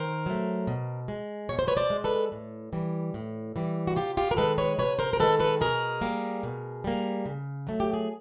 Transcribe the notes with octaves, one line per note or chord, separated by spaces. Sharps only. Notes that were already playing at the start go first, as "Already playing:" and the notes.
Already playing: D#3 A#4 C5
F#3 A3
B2
G#3
B2 C#5
C5
B4 C#5
C5 D5
G#3
A4 B4
A2
E3 G3
A2
E3 G3
F#4
C3 F4 G4
F4 G4
A#4
D#3 G#3 A4 B4
B4 C#5
C3 B4 C#5
A#4 C5
A#4
D#3 G#3 A4 B4
A4 B4
B2 G#4 A#4
G3 A#3
B2
G3 A#3
C#3
F#3 A3
G4
G#4